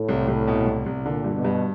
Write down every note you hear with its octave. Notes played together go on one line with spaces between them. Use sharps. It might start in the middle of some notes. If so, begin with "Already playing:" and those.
Already playing: A2
C2
C2
B2
C2
C2
A#2 D3
G2
B2
G2